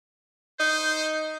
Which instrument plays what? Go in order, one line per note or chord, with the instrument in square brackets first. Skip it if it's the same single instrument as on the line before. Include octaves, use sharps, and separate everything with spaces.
[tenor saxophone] D#4 [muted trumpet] C5